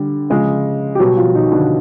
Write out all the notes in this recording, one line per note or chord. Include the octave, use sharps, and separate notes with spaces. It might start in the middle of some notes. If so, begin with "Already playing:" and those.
Already playing: D3 G3
C#3 F3 G#3
G4
B2 F#3 G3 F#4
F3 F4
D#3 D#4
D3 D4